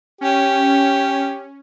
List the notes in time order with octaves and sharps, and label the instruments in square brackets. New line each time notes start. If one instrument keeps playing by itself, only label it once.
[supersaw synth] C#4 [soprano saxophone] G4